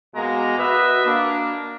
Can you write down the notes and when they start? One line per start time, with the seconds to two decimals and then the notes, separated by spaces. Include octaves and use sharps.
0.14 B2 G#3 A#3 A#5
0.57 F#4 B4 D#5 E5
1.05 A#3 D4